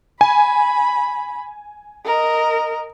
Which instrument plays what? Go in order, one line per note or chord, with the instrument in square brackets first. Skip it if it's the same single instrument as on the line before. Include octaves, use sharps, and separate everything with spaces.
[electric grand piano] G#5 [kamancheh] B5
[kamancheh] A#4 D#5